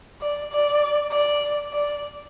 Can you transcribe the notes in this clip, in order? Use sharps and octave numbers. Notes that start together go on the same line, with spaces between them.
D5
D5
D5
D5